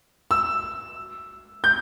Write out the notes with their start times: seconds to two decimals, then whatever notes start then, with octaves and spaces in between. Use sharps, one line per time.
0.31 E6
1.64 G6